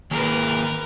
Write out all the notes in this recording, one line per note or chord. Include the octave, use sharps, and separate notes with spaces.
D#3 A#3 G#4 A#4 B4